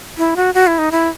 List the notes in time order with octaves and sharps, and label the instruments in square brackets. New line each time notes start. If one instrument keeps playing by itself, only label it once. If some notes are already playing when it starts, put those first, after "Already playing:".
[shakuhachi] E4
F#4
F#4
E4
D#4
E4